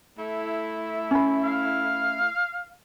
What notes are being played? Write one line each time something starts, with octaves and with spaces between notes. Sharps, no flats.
A3 E4
C#4 B5
F5